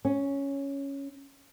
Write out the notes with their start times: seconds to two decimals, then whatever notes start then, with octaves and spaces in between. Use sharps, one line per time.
0.05 C#4